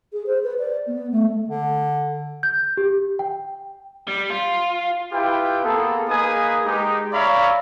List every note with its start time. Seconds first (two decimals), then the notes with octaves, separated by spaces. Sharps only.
0.13 G#4
0.26 C5
0.43 B4
0.59 D5
0.87 B3
1.11 A3
1.48 D3
2.43 G6
2.77 G4
3.19 G5
4.08 G3
4.30 F4
5.12 E4 F4 G4 B4 G5
5.63 A#3 B3 G#4 A4
6.08 A#3 D#4 G#4 B4 G#5 D#6
6.65 G#3 D#4 G4
7.12 C#5 D5 E5 F5 A#5 B5